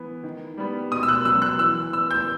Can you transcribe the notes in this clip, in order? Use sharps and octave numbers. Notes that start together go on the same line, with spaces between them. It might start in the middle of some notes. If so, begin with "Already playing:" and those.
Already playing: E3 B3
D#3
G3 B3
B2 D#6
E6
F#6
F#3 B3 E6
F#6
E3 E6
B3 E6
G6